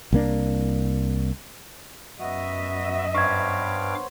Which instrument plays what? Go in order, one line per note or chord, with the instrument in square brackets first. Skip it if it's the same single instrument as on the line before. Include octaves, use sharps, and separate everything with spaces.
[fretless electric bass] C2 A#3 D4
[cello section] F#2 D#5 E5 [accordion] B3 F#4
[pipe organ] G2 F5 D6 [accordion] B3 C5 C#5 [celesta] C#6 G#6